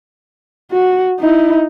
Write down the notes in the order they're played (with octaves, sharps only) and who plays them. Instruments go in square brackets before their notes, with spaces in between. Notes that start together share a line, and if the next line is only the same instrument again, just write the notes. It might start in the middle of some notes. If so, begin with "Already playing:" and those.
[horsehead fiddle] F#4
D#4 E4